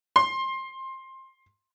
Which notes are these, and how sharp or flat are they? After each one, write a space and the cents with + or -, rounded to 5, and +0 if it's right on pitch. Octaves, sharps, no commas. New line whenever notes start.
C6 +20